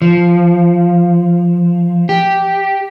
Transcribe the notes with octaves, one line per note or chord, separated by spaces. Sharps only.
F3
G4